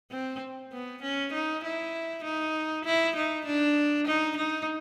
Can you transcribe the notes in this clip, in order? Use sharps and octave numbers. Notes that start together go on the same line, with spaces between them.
C4
B3
C#4
D#4
E4
D#4
E4
D#4
D4
D#4
D#4